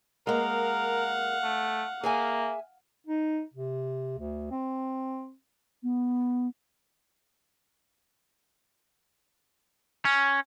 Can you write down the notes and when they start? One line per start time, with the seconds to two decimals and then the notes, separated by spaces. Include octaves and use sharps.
0.27 G#3 A#3 A#4 F5 F#5
1.44 A3
2.03 A#3 G#4 E5 G#5
3.07 D#4
3.54 C3
4.18 D2
4.51 C4
5.83 B3
10.05 C#4